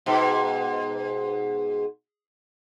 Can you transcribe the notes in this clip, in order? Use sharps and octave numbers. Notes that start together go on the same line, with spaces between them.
G#2 B2